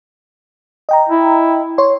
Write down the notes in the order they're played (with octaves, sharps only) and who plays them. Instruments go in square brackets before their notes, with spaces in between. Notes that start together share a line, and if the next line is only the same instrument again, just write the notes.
[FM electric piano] D#5 G5 A#5
[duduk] E4
[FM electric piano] C#5 C6